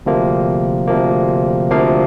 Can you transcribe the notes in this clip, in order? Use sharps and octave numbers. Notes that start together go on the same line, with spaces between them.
D2 C3 F3 A#3
D2 C3 F3 A#3
D2 C3 F3 A#3 F5